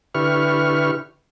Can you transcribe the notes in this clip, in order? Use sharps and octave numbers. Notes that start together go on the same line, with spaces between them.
D3 E4 G4 B4 C#6 F6